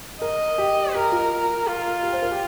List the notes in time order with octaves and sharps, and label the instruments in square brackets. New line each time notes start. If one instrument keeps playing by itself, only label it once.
[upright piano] A#4 [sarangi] D#5
[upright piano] G4
[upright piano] G4 [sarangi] A#4
[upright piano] F4
[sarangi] F4
[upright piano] G4
C5
A#4
G4